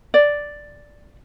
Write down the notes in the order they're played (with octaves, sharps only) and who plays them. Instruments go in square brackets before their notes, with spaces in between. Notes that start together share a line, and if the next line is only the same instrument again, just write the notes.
[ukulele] D5